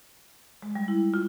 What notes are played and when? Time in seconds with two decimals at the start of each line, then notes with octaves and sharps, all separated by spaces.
0.62 G#3
0.75 G3
0.88 E4
1.14 F4